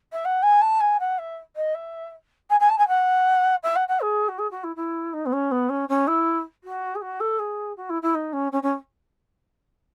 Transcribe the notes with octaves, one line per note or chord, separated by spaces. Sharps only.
E5
F#5
G#5
A5
G#5
F#5
E5
D#5
E5
G#5
G#5
A5
G#5
F#5
E5
F#5
F#5
G#4
F#4
G#4
F#4
E4
E4
D#4
B3
C#4
B3
C#4
C#4
E4
F#4
G#4
F#4
A4
G#4
F#4
E4
E4
D#4
C#4
C#4
C#4